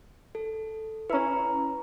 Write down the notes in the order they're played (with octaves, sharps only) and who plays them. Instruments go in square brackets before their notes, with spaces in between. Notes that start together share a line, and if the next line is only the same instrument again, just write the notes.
[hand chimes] A4
[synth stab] C#4 E4 [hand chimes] B4 A#5